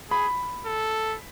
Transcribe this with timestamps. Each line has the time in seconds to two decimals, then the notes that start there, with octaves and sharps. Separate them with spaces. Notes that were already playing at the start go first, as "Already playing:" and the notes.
0.10 G#4 B5
0.66 A4